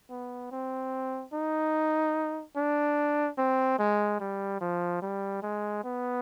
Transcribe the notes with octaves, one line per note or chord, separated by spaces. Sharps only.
B3
C4
D#4
D4
C4
G#3
G3
F3
G3
G#3
B3